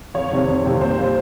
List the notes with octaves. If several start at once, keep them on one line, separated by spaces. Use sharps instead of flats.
F2 C#5
C3 D#3 G3 C4
F2
C3 D#3 G3 C4
A#2 C5
G3 A#3